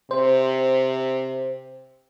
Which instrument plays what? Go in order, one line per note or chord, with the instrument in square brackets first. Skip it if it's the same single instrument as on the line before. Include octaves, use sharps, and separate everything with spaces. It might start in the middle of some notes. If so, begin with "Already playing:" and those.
[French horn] C3 [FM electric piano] C5